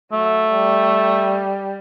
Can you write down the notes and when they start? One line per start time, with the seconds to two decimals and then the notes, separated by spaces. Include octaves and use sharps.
0.12 F#3 A3
0.52 G3